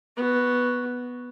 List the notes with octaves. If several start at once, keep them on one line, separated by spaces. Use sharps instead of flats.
B3 F#4